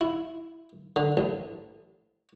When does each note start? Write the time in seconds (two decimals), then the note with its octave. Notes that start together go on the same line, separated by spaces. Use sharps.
0.01 E4
0.96 D3
1.17 A1